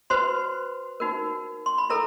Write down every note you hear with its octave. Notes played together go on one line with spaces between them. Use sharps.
F#4 B4 C5 C6
D#4 F#4 A#4
C6
B5
E4 A4 A#4 A#5